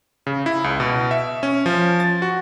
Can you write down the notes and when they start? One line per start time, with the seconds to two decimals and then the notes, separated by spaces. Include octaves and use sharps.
0.27 C#3
0.46 E4
0.64 C#2
0.80 B2
1.11 E5
1.43 C#4
1.66 F3
2.00 A6
2.22 F#4